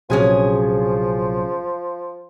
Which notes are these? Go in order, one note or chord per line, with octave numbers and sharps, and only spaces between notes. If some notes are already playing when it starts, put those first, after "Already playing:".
A#1 C3 F3 F#3 C#4 G#4 G#5